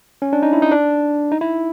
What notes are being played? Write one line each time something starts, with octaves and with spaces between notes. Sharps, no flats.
C#4
D4
D#4
E4
D#4
D4
D#4
E4